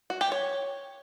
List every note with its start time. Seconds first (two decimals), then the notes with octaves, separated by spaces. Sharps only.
0.10 F#4
0.21 G4
0.32 C#5